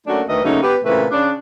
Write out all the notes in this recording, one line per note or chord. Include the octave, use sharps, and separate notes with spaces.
F#3 A3 A#3 C#4 D4 F#4
D2 D#3 A3 A#4 B4 D#5
C#3 F#3 A3 A#3 C#4 D#4
B3 G4 B4
A#2 C#3 E3 A3 C4 B4
C#3 D4